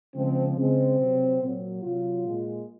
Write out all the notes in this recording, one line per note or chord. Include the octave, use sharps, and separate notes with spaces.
C#3 F3 G#3 C4
C#3 G#3 C4
C3 F#3
A#2 F#3
C3 F#3 F4
A#2 G#3